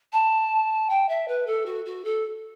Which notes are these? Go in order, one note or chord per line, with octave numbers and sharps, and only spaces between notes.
A5
G5
E5
B4
A4
F#4
F#4
A4